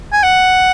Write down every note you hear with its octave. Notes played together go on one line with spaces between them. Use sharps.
G#5
F#5